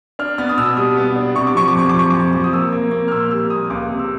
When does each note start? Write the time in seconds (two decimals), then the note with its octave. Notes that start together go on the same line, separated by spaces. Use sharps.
0.19 D4 F6
0.38 B3 F6
0.49 D#6
0.57 B2 E6
0.77 G3 D#6
0.97 B3
1.16 D4
1.36 C3 C#6
1.47 D6
1.55 F3 C#6
1.68 D6
1.75 F2 C#6
1.89 D6
1.95 F3 C#6
2.10 F2 D6
2.20 C#6
2.33 F3
2.44 D#6
2.53 A#3 E6
2.73 A#3
2.92 A#3
3.08 F6
3.11 A#2 E6
3.31 G3 E6
3.50 A#2 D#6
3.70 C#2 D6
3.89 C3
3.99 E6